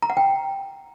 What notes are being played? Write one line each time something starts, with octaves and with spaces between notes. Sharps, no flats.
A#5
F#5
G5